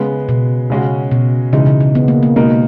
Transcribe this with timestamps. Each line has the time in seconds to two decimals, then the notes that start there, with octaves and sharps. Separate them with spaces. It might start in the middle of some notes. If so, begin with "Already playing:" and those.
Already playing: C#3 G#3 B3
0.29 B2
0.70 C#3 G#3 C#4 F#4
1.11 B2
1.53 C#3 E3 G#3 D#4
1.66 C#3
1.81 C#3
1.95 B3
2.08 A#3
2.23 A#3
2.36 B2 G#3 A#3 D#4